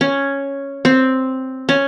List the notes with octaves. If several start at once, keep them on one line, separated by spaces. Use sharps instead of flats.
C#4
C4
C#4